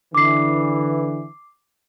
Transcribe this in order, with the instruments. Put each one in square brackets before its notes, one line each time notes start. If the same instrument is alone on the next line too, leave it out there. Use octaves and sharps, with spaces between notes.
[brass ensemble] D3 E3 [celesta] D6 C7